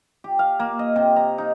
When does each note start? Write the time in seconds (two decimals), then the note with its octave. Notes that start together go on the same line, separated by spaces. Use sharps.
0.24 G4
0.39 F5
0.60 A#3
0.79 D#5
0.96 C3
1.16 A#5
1.38 D#4